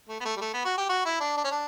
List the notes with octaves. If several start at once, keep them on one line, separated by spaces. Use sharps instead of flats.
A3
B3
A3
G3
A3
B3
F#4
G4
F#4
E4
D4
D4
C#4
D4